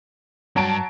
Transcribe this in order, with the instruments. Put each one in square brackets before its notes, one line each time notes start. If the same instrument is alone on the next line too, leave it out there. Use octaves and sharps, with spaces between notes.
[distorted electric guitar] G2 [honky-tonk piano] F#3 A5 D7